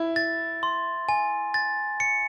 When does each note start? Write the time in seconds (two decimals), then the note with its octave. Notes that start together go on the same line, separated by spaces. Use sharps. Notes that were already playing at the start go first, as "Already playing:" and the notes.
Already playing: E4
0.16 A6
0.63 C6
1.09 G#5
1.54 A6
2.00 C#7